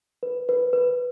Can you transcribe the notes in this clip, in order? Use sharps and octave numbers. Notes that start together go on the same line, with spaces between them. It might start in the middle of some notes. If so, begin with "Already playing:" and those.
B4
B4
B4